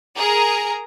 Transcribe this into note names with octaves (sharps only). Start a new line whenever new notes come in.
G#4 A#4 A#5